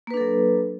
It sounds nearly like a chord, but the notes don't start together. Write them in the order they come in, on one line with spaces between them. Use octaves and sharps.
A#3 B4 D4 A4 F#3